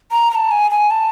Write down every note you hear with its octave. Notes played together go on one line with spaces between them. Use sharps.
A#5
A#5
A5
G#5
G#5
A5